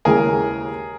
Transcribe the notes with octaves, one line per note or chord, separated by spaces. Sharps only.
D#2 C#3 E3 G#3 G#4 A#4